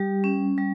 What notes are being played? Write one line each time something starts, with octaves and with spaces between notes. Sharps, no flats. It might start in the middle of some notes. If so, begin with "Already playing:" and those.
Already playing: G3 G4
C#4
G3